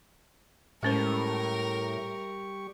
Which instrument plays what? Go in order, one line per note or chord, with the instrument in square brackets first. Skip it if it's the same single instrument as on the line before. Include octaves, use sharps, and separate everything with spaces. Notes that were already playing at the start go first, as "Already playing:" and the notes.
[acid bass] A2 [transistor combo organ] G3 G4 C#6 [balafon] G#3 C#4 C5 [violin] A#4